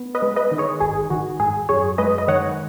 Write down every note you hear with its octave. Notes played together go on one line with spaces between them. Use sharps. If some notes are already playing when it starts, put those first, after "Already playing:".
Already playing: B3
B4 D#5
G#3
B4 D#5
D#3
G#4 C#5
G#1 G#4
D#3 F#4
G#2 G#4
F#2 G#4 C#5
G#3 B4 D#5
D#5
D#3 C#5 F#5